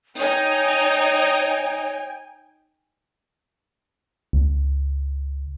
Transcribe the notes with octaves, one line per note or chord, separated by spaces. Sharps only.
D#4 C#5 G5 G#5
C#2